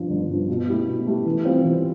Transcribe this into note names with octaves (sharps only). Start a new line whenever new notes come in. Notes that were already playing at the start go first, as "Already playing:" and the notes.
Already playing: G1 G2 F3
G1
G2 F3
B2
A3 E4 G4
B2
A3 E4 G4
E3
G3 C4 F4
E3